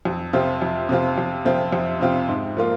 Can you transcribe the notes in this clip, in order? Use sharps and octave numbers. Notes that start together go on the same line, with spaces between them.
F2
C3 F3 C4 F4
F2
C3 F3 C4 F4
F2
C3 F3 C4 F4
F2
C3 F3 C4 F4
G#2
F3 A#3 F4